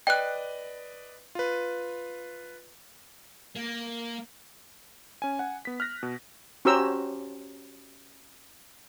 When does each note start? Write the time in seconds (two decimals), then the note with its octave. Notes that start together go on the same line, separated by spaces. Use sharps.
0.07 B4 D5 D#5 G5 F#6
1.35 F4 B4
3.55 A#3
5.22 C#4 G#5
5.39 F#5 G#5
5.65 B3 B6
5.80 F6 F#6 A#6
6.03 B2
6.65 C#4 F#4 G4 C5 A#5 E6